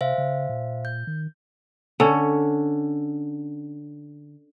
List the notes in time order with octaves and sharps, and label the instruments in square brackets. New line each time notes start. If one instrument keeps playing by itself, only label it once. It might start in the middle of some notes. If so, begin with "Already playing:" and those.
[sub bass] C3 [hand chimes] C5 E5 F5
[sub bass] C#3
A#2
[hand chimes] G6
[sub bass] D#3
[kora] D3 C#4